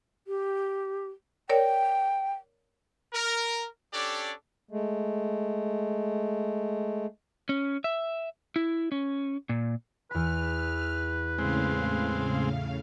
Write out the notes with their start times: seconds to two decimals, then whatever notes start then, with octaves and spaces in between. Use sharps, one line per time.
0.27 G4
1.50 A#4 C#5 D5 G5
3.13 A#4
3.93 C#4 D4 G4 A4 C#5 D5
4.71 G#3 A3
7.49 C#4
7.84 E5
8.56 E4
8.92 C#4
9.49 A#2
10.11 E2 B4 B5 F6
11.38 A2 C#3 G#3 C4 F5